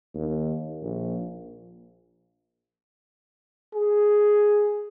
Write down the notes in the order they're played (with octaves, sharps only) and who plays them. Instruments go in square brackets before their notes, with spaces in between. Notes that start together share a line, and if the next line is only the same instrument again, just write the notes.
[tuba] D#2
A#1
[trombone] G#4